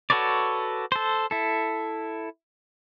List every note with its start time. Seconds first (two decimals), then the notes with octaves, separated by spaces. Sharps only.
0.10 F#4 A4 B4 C#5 D5
0.92 A4 C5
1.31 E4 A4